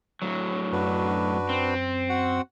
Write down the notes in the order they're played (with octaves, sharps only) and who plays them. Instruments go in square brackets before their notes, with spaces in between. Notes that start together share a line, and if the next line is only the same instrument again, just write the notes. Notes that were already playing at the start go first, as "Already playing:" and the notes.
[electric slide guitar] A2 F#3
[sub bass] F#2 [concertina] D4 F#4 B4
[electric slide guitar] C4
[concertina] F#4 F#5